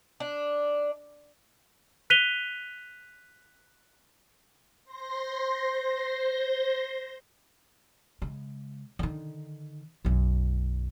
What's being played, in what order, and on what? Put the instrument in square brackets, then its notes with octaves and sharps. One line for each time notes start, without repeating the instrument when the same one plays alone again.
[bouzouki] D4
[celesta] F#6 B6 D#7 F7 G7
[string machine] C5 C6 A#6
[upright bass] C#3 G#3
D3 D#3
B1 F#2